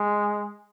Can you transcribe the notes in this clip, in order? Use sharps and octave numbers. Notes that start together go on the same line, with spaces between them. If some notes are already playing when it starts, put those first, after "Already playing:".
Already playing: G#3